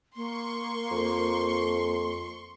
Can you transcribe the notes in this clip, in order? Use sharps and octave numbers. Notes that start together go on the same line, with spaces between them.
A#3 C6 C#6
F2